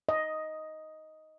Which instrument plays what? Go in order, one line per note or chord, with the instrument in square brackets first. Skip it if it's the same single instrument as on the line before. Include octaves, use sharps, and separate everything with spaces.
[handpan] D#5